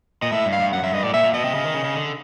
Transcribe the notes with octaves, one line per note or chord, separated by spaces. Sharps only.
A#2 D#5
A2 E5
G2
F5
G2
F#2 F#5
F#2 E5
G2 D#5
A2 D5
A#2 E5
A#2
B2 D#5
C3
C#3
D#3
C#3
C#3
D3